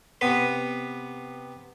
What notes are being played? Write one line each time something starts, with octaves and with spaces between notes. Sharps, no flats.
C3 B3 B4